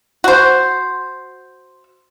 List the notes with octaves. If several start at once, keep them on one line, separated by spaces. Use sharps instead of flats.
F#4 C5